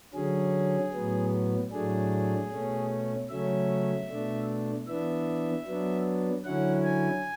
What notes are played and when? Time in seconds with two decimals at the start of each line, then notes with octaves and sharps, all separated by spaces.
0.14 D3 F#3 C#4 G#4
0.93 A2 F#3 B3
1.72 A2 F#3 A3 D4 G#4
2.50 B2 A3 C#4
3.29 C#3 F#3 A3 C#4 E5
4.08 B2 A3 D4
4.87 E3 B3 D4 E5
5.67 F#3 B3 D4
6.44 D3 F#3 C#4 E4 F#5
6.84 G#5